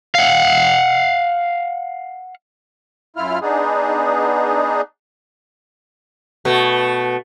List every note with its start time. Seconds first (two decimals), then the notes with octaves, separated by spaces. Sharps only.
0.15 F5 F#5
3.16 F#2 E4 F4 F6
3.42 B3 D4 D#4 G#4
6.45 B2 A3